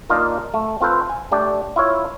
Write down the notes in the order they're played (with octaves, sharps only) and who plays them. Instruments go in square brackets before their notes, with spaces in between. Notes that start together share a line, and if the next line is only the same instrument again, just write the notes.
[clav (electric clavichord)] A#3 D4 D#4 F4 A#4
A3
C4 F4 A4 B4 C5
G#5
A3 D4 G4 D5
E4 F4 C#5